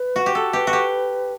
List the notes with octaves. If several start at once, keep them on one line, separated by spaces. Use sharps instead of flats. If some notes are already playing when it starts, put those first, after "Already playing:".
Already playing: B4
F#4
G4
A4
G4 B4
F#4
G4